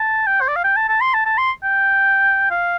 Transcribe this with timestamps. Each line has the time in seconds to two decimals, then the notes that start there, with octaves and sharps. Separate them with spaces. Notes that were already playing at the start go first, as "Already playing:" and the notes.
Already playing: A5
0.27 G5
0.41 C5
0.48 D5
0.56 F5
0.64 G5
0.76 A5
0.89 A5
1.01 C6
1.14 A5
1.26 A5
1.38 C6
1.63 G5
2.51 F5